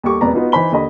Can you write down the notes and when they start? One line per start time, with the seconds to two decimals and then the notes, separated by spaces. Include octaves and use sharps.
0.04 D#2 G3 A4 C#6 D6
0.21 E1 F2 A#3 B3 D5 A#5
0.34 B3 D#4 F4 F#4
0.52 E3 D#4 C5 B5 G7
0.72 D#2 D3 D#5 B5